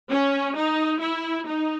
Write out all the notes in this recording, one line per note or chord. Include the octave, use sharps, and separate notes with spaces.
C#4
D#4
E4
D#4